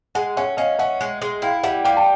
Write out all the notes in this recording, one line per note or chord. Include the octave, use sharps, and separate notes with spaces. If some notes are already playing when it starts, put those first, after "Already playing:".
G#3 F#5 G#5
C#4 E5 F#5
C#4 D#5 F5
C#4 E5 F#5
G#3
G#3
E4 F5 G5
G3 E5 F#5
G3 F5 G5
A5